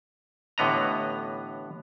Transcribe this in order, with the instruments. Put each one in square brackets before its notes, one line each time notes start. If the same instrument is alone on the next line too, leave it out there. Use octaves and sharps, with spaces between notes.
[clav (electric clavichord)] A1 A2 D3 B3 D#5 A#5